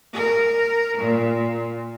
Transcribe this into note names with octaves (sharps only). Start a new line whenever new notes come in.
A#4
A#2